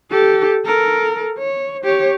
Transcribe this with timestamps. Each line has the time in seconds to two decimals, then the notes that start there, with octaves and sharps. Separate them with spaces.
0.11 G4 A4
0.66 A4 A#4
1.39 C#5
1.84 G4 C#5